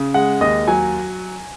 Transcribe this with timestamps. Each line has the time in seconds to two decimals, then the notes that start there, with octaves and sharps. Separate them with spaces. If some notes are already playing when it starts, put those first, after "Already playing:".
Already playing: C#3
0.14 G#3 F#5
0.41 D#2 D#5
0.68 F#3 G#5